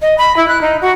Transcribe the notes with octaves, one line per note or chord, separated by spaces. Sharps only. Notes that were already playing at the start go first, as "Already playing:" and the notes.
D#5
B5
E4
F#6
D#4
F#4